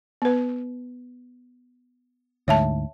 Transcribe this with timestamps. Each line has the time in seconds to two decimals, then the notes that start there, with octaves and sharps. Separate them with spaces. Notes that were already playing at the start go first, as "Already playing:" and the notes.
0.22 B3 B4
2.48 D2 G#2 C#5 E5 A5